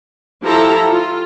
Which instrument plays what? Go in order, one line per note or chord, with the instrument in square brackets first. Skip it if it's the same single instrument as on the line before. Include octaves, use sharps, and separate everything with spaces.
[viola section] F3 E4 G4 A4 A#5
F4